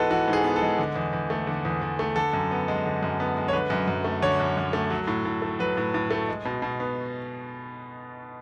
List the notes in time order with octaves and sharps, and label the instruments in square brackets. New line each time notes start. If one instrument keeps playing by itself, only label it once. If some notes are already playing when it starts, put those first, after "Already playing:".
Already playing: [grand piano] G#2 E3 G#3 B3 F#4 A4 B4
E3 F#4
G#2
G#4
B3
A4
G#3
D3
E2
E2
A3
D3
E2
E2
A3
D3 A4
F#2
B3
G#3
D3
F#2
B3
G#3
C#5
D3 B4
F#2
F#2
A3
D3 C#5
F#2
F#2
A3
F#3
A2
A2
A3
F#3 B4
A2
A2
A3
G#3
B2
B2
B3